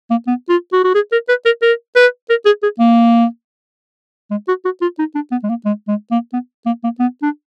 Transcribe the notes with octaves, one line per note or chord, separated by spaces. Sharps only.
A#3
B3
F4
F#4
F#4
G#4
A#4
B4
A#4
A#4
B4
A#4
G#4
G#4
A#3
G#3
F#4
F#4
F4
D#4
D4
B3
G#3
A#3
G#3
G#3
A#3
B3
A#3
A#3
B3
D4